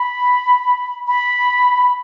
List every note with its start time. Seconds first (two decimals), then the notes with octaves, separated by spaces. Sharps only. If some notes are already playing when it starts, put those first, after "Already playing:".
Already playing: B5
1.07 B5